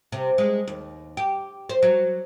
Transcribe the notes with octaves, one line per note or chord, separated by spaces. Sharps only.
C3
G#3
D#2
G4
C5
F#3